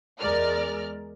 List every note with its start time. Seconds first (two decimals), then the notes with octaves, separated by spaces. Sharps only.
0.19 E2 G#3 A#4 D5 F6